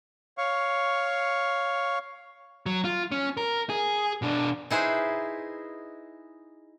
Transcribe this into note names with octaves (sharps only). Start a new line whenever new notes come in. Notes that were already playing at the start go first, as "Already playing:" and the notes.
C#5 F5 C#6
F#3
F4
C#4
A#4
G#4
B2 D4
D#4 E4 G#4 B4 C5